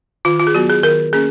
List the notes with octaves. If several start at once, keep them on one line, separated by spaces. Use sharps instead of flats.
D#3 F4
F4
G#4
F#3 B3 F#4
G#4
D#3 A#4
A#3 C#4 G#4